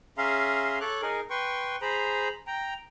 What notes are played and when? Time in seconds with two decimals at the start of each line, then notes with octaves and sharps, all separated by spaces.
0.18 C#4 G#4 E5 F5 A#5 C6
0.81 A4 C#5 D6 F#6
1.02 D#4 G#4 A#4
1.30 B4 G5 C6 C#6
1.82 G#4 C5 A#5 B5
2.47 G5 A#5